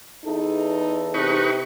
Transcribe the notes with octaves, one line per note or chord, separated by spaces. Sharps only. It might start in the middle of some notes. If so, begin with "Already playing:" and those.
E2 D#4 A4
C3 D#4 B4 C#6